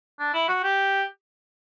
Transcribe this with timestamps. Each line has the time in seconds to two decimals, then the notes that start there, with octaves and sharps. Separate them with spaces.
0.19 D4
0.33 E4
0.48 F#4
0.63 G4